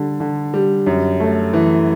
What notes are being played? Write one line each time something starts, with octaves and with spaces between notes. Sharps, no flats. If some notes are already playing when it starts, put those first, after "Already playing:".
Already playing: D3 G3
D3
G3
F#2
A3
E3